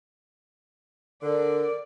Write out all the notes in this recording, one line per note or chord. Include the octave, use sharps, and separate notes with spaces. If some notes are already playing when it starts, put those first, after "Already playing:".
D3 A#4 D5